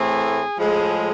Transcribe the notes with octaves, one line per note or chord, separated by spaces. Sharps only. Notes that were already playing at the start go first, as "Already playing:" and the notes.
Already playing: A2 E3 A3 C4 G#4
A2 F3 G#3